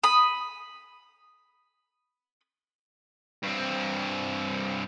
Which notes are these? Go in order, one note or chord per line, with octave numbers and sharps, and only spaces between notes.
B5 D#6
G2 C4